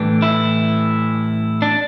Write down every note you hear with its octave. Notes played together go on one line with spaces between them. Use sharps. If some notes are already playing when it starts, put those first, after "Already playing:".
Already playing: A2 E3 G3 D4
E4
D4